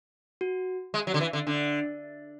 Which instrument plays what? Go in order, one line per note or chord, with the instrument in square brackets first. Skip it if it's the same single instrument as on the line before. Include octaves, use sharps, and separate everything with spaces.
[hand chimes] F#4
[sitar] G#3
F#3
D3
E3
D3
[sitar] D3 [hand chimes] D4